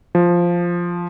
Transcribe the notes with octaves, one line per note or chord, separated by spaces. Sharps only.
F3